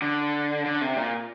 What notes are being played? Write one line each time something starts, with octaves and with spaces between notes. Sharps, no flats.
D3
D3
C3
A#2